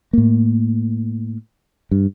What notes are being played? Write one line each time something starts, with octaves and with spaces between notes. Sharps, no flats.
A2 A#3
G2